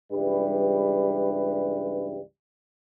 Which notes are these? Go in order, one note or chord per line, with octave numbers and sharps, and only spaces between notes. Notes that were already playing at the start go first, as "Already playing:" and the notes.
C#2 G2 E3 G3 B4